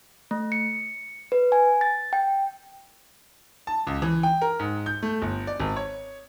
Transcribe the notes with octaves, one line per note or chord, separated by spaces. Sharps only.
A3
C#7
B4
G#5
A6
G5
A5
C#2
E3
G5
A#4
G#2
G6
A3
G1
D5
G#1
C#5